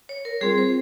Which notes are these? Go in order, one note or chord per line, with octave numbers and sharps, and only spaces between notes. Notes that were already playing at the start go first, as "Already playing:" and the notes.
C#5
A#4
G3 C4 F4 G#4
C5